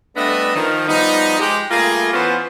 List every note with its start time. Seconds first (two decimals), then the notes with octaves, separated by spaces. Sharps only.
0.17 G3 A3 B3 D4 D#5 E5
0.55 D#3 F3
0.88 F3 G3 B3 D#4
1.40 G#3 G4
1.71 G3 A3 A#3 F4 G#4
2.13 E3 B3 C#4 F4 C5